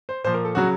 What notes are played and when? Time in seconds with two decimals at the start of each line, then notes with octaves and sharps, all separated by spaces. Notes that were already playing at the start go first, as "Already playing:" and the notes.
0.09 C5
0.24 A#2 F3 C5
0.34 A#4
0.45 A4
0.55 C#3 F#3 F#4